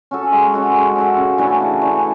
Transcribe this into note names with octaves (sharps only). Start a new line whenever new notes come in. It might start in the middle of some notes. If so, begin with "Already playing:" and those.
C#4 F#4 A4
G#3
C#4 F#4 A4
G#3
C#4 F#4 A4
C#3
E3 A3 D4
C#3
E3 A3 D4